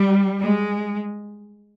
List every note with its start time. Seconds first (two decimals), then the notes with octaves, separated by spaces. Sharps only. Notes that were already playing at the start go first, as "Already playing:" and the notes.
Already playing: G3
0.40 G#3